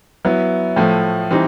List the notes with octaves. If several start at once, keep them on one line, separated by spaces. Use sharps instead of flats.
F#3 B3 E4
A2 F3 A3
E3 G3 C4 D#4